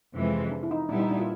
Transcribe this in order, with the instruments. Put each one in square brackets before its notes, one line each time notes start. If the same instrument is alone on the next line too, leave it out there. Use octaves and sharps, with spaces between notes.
[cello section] F2 C3 E3 G#3
[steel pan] D4
E4
D#4
[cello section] A#2 G3 B3 E4 [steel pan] D4
[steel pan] D#4
D4
F4